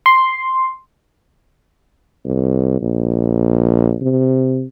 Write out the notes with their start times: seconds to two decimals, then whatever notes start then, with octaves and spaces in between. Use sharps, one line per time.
0.06 C6
2.25 C2
2.81 A#1
4.01 C3